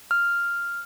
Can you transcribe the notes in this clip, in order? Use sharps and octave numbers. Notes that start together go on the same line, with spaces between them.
F6